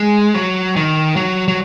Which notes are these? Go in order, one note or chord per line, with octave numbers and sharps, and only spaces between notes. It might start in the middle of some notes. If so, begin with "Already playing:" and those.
Already playing: G#3
F#3
D#3
F#3
F#3